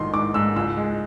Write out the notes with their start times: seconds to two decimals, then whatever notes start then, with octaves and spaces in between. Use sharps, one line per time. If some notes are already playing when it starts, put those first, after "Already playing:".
Already playing: A#1 G#2 D#3 C6
0.14 G#2 D6
0.34 G#2 E6
0.56 C#2 E6
0.77 G#3